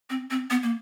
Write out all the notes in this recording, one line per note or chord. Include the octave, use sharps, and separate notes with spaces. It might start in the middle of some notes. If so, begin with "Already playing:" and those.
C4
C4
B3
A#3